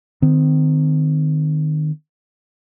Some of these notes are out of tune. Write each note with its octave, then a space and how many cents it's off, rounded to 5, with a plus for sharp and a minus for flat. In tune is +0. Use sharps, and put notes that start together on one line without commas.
D#3 -25 C4 -35